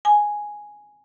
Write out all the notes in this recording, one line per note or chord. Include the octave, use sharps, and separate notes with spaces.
G#5